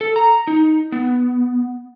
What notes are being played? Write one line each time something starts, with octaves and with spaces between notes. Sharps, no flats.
A4
A#5
D#4
B3